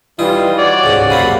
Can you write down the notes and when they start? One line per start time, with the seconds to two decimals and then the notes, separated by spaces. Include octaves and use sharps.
0.19 E3 G3 D#4 F4
0.58 F#4 C#5 D5
0.84 C#2 G#2 C3
1.10 F#2 C3 A#3 C4 F5 B5